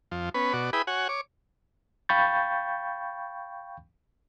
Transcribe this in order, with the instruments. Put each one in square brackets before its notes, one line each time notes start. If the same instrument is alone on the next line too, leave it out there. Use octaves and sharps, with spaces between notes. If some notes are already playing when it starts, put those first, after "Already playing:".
[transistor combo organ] F2 F3
B3 C#4 B4
B2 F#4 D5
E4 G#4 B4 G5 B5 D#6
F#4 C#5 F#5 G#5
C#5 D6
[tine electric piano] F5 G5 B5 C#6 G6 A6